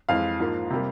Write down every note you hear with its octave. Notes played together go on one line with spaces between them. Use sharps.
F2 E3 G#3 F5
G#2 F3 A#3
C3 G3 A#3